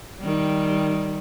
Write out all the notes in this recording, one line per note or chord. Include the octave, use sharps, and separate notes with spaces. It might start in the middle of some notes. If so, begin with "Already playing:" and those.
D#3 G3